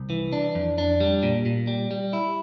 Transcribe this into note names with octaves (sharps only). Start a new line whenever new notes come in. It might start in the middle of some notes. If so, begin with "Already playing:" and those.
Already playing: C2
E3
D4
F2
D4
G3
A#2
A#2
G3
G3
E4